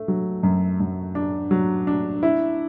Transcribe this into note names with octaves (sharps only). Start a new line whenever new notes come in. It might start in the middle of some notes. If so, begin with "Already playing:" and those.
Already playing: A3
F#3
F#2
F#2
D4
F#3
D4
E4